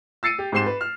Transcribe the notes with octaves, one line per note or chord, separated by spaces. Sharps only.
E6 A6 C7 C#7 D#7
G4
G#2 C4 G4 C6 C7 E7
B4
F6